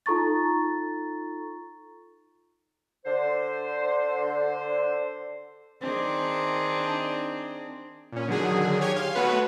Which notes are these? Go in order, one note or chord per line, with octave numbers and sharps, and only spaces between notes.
D#4 F4 A4 A#5 C#6 A6
D3 C5
D#3 C4 D4 G#4
A#2 C#4
D3 D#3 F#3 G#4
G4 C#5 G#5 G#6
F5 C6
A3 B3 F#4 B4 C#5